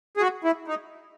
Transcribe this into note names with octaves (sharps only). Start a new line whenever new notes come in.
G#4
F#4
E4
D#4